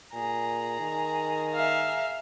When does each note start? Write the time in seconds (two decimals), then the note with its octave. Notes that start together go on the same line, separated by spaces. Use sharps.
0.14 A#2 G#4 A#5
0.80 D#3
1.54 E5 F5